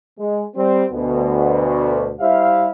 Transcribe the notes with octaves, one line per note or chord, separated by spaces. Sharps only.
G#3
G3 C4
D2 B2
G3 E4 G4 C5 E5 F5